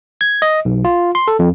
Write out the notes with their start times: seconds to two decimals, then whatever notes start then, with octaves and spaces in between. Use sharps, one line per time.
0.21 G#6
0.42 D#5
0.65 B1
0.85 F4
1.15 C6
1.28 A4
1.39 F2